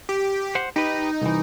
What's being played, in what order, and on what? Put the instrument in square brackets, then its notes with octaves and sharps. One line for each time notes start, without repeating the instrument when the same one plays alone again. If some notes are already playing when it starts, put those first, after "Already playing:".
[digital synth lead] G4
[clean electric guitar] C5 F#5
[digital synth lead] D#4 [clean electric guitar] G4 B4
[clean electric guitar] C2 E3